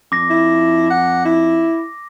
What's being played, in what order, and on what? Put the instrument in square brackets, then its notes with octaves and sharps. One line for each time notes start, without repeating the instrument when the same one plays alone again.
[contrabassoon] F2 [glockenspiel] D6 A#6
[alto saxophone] E4
F#5
E4